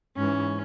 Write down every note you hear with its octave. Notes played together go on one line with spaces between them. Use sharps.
G#2 E3 C#4